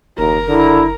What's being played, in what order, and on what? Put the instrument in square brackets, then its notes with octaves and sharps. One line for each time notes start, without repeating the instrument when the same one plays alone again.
[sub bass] F#1 [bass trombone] D#2 [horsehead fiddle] A#4 A#5
[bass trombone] D3 [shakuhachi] E4